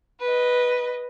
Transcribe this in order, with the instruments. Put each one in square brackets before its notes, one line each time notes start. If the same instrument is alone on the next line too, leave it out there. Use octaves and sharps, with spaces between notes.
[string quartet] B4 D#5